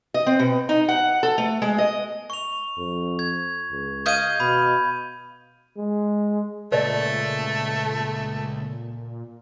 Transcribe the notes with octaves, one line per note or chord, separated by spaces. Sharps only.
D#5
C4
B2
D#4
F#5
A4
A3
G#3
D#5
C#6 F7
F2
G#6
C#2
D#5 F5 G6 G#6 D#7
B2 B5
G#3
C#2 A#2 A3 B4 D5 D#5